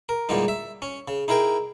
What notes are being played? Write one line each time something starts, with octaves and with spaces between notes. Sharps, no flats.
A#4
E2 A#2 D3 G3 G#3 D#4
E5
C#4
C#3
D#4 E4 G#4 A#4 G5